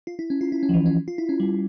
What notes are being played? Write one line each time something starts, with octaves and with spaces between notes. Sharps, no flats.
F4
E4
C#4
F4
E4
C#4
F3
E3
C#4
F4
E4
C#4
G3